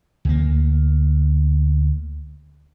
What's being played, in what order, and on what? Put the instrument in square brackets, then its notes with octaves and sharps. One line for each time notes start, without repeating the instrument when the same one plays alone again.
[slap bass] D2 A#3